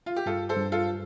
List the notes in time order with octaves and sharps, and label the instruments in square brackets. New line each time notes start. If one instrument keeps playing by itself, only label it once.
[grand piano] F4
G4
[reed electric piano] G2 [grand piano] F4 A4
[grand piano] A4 C5
[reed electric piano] G2
[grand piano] F4 A4